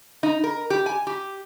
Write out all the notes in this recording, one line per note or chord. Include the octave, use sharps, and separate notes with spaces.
D#4
A#4
G4
G#5
G4